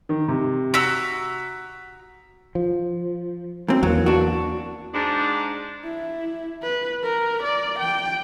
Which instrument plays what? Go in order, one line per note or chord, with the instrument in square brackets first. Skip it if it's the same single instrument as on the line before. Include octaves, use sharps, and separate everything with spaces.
[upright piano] D#3
C3
[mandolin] F#4 A#5 E6 [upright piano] B6
[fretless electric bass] F3
[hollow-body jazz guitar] F#2 C4
[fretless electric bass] E2 E3 A#3 [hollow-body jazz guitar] F#3
[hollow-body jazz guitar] D4 F#4
[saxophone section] G#2 D4
[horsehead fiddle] E4
B4
A#4
D5
G5